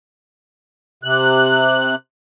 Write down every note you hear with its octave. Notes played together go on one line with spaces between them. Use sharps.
C3 F#6